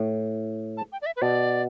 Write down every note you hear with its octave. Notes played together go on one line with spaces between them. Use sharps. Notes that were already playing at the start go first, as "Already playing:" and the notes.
Already playing: A2
A5
G5
D5
E5
B4
B2 D5